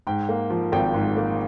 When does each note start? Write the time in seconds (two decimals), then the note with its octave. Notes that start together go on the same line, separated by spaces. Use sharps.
0.07 G#2 G5
0.29 A#3
0.50 F3
0.72 G#1 G5
0.94 G#2
1.17 A#3